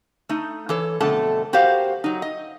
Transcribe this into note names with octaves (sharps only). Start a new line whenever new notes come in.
A3 D#4
E3 A4 C#5
F2 B2 D3 A3 A4 A5
F#4 G4 A#4 C5 F5
F#3 D#4
D#5